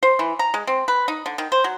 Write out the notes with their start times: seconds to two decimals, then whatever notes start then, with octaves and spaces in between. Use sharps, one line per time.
0.03 C5
0.19 E3
0.39 A#5
0.54 G#3
0.67 C4
0.88 B4
1.08 D#4
1.26 D3
1.38 D#3
1.52 C5
1.64 F#3